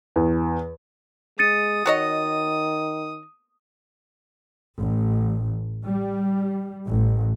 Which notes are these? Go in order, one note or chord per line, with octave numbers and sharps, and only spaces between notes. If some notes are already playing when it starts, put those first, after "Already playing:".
E2
G#3 D#6 A6 C#7 D#7
D#3 F#4 C#5 D#5
A1
G3
A1